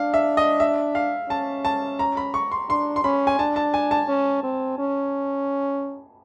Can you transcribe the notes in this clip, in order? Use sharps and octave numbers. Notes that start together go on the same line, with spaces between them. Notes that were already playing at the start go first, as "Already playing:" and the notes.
Already playing: D4 F5
E5
D#5
E5
F5
C#4 A5
A5
A#5
B5
C#6
C6
D4 C6
C6
C#4 B5
G#5
D4 A5
A5
G#5
A5
C#4
C4
C#4